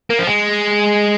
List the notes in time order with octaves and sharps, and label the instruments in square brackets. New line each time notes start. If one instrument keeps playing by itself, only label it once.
[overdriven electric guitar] A#3
F3
G#3